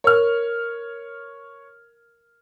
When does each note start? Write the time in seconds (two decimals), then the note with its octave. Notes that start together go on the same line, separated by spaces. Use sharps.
0.04 A#4 C#5 F6